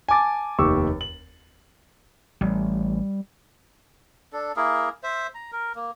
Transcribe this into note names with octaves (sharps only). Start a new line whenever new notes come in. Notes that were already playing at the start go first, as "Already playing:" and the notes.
G#5 A5 D6 A6
F1 D#2 G4 C#6 D6 E6
F#7
A1 G3
D4 A4
A#3 E4 G#4 A#4
C5 E5
A#5
A#4
A#3